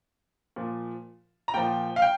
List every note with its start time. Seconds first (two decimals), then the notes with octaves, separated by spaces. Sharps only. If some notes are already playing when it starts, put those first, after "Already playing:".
0.56 A#2 F3
1.48 A#5
1.54 A#2 F3 G5
1.96 F5
2.02 G5